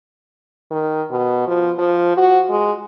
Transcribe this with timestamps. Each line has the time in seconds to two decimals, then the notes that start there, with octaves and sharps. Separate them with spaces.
0.71 D#3
1.11 B2
1.47 F3
1.79 F3
2.17 F#4
2.50 G#3